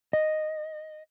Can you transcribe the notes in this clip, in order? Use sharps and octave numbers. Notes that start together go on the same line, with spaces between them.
D#5